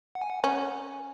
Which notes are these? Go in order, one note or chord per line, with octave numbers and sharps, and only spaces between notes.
F#5
G#5
F#5
C#4 G#5